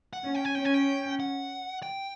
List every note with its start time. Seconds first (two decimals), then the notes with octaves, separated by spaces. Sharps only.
0.13 F#5
0.24 C#4
0.35 G5
0.45 G#5
0.55 C#4 G5
0.65 G#5
0.74 G5
1.20 F#5
1.83 G5